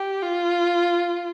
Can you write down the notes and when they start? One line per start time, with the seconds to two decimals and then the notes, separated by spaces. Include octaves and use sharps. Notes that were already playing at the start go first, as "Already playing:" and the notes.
Already playing: G4
0.23 F4